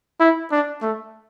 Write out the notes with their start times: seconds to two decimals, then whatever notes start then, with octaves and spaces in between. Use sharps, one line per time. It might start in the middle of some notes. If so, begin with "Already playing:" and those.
0.20 E4
0.51 D4
0.82 A3